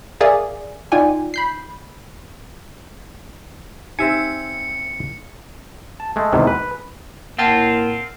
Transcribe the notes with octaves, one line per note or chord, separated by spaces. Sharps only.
G#4 A#4 D5 E5 F5 G#5
D#4 F4 D5 G5 G#5
B5 G6 C7
C4 D#4 G4 E5 G#5 C#7
A5
G#3 A3
E2 G#2 C3 D#3
B4
A2 A#3 C4 F4 F#5 G5 A5